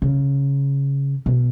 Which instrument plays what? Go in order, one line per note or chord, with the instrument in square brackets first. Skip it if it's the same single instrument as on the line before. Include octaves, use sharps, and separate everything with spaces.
[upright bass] C#3
B2